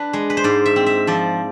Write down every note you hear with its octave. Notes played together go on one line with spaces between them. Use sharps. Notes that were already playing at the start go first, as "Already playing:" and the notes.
Already playing: D4 B4
G#3
B4
C5
G#2 D5
E5
C4
E5
F3 D5